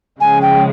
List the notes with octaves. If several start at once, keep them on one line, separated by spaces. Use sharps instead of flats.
C#3 F3 G#3 G#5
G5